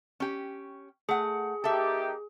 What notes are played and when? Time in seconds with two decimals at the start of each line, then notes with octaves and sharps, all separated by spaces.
0.20 C#4 G4
1.09 A3 G#4 F#5
1.64 A#3 D#4 G4 A4 E5